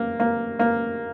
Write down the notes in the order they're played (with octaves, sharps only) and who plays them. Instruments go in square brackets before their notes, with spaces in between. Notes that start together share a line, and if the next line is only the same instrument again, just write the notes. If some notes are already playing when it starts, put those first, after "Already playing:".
Already playing: [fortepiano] A#3
A#3
A#3